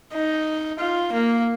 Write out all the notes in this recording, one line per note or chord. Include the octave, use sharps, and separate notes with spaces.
D#4
F4
A#3